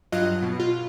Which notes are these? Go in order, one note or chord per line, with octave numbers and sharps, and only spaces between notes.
G2 F#3 F4 D#5 F#6
B2
F4